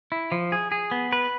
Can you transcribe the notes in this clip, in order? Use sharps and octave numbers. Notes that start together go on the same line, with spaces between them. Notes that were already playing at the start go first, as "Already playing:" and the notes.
E4
F3
G#4
G#4
B3
B4